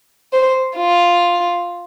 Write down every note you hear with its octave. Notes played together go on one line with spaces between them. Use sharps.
C5
F4